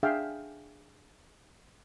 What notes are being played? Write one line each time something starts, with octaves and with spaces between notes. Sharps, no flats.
D4 G#4 E5 F5 G5